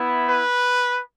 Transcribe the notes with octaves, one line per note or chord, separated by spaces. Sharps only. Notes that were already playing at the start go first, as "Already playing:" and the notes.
Already playing: B3 E4
B4